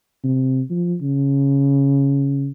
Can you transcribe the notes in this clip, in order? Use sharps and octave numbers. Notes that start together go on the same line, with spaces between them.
C3
F3
C#3